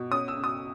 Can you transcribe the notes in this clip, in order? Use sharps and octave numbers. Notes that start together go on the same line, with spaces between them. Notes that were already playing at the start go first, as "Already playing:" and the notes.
Already playing: B2
C#4 D#6
E6
C#3
D#6